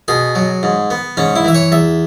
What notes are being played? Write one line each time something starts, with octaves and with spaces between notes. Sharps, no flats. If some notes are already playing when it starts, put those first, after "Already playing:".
B2 G#4
F#3
G#2
B3
G#2 C#4
E4
E3 E5
C#5
E2 E5